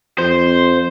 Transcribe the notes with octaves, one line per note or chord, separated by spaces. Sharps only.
F2 C5